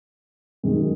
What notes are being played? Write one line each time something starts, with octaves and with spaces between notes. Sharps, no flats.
F#2 D#3 G#3